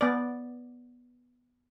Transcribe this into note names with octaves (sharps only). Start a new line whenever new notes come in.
B3 D5